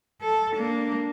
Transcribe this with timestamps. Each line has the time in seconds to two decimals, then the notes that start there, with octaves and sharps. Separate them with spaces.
0.22 A4
0.56 A#3 D4